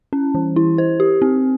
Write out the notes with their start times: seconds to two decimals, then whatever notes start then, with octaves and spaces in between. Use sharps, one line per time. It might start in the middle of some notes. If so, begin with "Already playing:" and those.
0.13 C#4
0.35 E3
0.56 E4
0.78 C5
1.00 G4
1.22 C4